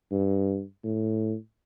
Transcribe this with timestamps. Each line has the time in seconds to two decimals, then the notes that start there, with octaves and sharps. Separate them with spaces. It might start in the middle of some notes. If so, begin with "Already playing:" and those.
0.11 G2
0.84 A2